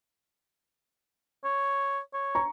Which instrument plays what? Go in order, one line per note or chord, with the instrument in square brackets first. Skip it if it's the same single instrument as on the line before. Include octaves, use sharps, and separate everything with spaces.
[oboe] C#5
C#5
[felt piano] A#5 C#6